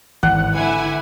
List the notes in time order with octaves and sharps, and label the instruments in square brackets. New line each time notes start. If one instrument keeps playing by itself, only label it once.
[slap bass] G#1 [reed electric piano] E3 [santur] F#5
[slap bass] D3 [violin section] E4 G#5